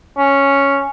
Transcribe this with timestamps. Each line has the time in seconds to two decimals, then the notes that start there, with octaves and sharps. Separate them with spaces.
0.18 C#4